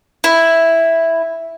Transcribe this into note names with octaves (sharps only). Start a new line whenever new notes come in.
E4